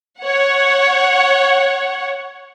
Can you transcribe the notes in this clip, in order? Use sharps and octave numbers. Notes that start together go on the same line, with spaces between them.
C#5 F#5